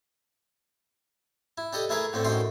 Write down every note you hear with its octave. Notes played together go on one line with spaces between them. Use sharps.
E4
D4 G4 A4 D#5
A3 E4 G#4 A#4 B4 E5
A2 D3 A3 C4
F#2 A2 D#3 C5 G5 C6